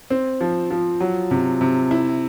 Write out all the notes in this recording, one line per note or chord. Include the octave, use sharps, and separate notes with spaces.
C4
F3
F3
F#3
C3
C3
E4